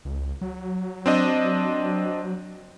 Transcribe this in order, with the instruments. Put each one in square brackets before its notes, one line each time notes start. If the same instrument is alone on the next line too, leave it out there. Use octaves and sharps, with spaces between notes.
[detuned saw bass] C#2
F#3
[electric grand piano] C4 D4 D#5